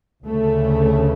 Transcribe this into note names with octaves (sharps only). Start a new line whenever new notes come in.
D2 C#3 A3